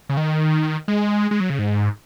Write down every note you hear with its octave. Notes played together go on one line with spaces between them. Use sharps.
C#3
D#3
G#3
G#3
F#3
C#3
G#2